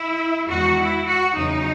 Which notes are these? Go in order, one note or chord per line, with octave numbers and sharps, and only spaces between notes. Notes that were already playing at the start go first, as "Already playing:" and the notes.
Already playing: E4
E2 D#3 G#3 D#4 F#4
E4
F#4
E2 C#3 F#3 D#4